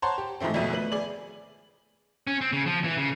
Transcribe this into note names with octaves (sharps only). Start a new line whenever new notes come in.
C5 C#5 F#5 A5 A#5 C6
G4
G#2 E3 F3 A3 C4
G#1 F2 B2 A3 E5 D#7
A3 B4 F#7
G#4 D5 F#7
C#4
C4
C#3
F3
E3
C#3